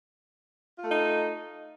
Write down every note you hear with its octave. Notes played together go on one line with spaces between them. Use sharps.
A3 D#4 F4 A4